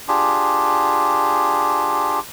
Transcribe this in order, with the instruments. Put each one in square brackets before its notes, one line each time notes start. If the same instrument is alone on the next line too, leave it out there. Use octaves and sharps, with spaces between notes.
[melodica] D4 F4 G4 G#4